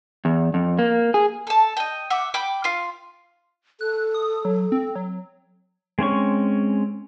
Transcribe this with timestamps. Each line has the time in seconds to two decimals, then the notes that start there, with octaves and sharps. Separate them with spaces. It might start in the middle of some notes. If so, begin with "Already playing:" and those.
0.25 E2
0.54 F2
0.79 A#3
1.14 G#4
1.47 A4 A5
1.77 D#5 G5
2.10 E5 F#5 D6
2.34 G5 B5 D6
2.64 F4 F5
3.81 A4 F#6
4.14 D#6
4.45 F#3
4.72 C4
4.95 F#3
5.99 G#3 C4 C#4 C#6